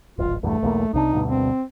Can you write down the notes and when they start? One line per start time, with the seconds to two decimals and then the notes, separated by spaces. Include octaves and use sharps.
0.18 D1 G#1 F4
0.43 A#1 E2 G2 A3
0.63 B1 E2 A#3
0.93 C2 C3 D4 D#4
1.13 D2 G2 B2
1.27 C4